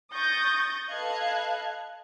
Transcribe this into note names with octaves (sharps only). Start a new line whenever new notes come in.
C#6 D#6 G6 A6 A#6
A4 B4 D#5 F5 F#6 G#6